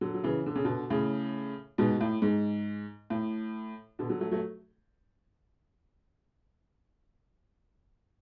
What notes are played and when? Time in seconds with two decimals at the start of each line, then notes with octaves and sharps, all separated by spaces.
0.01 D3 F#3
0.14 F#3
0.24 C#3 E3
0.46 D3
0.55 C#3
0.65 B2 D3
0.90 A2 C#3
1.78 G#2 B2
2.01 A2
2.22 G#2
3.10 A2
3.99 B2 D3
4.09 D3 F#3
4.21 F#3 A3
4.31 F#3 A3